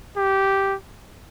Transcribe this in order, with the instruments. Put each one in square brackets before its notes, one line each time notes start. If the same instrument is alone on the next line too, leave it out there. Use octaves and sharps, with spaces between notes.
[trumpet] G4